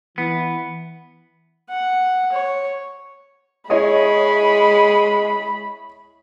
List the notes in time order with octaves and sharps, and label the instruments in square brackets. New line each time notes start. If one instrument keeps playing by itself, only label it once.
[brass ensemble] E3 [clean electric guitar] B3
[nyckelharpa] F#5
C#5
[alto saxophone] G#3 [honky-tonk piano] E4 C#5 D#5 [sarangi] B5